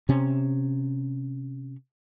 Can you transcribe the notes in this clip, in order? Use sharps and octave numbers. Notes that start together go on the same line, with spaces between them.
C3 C#4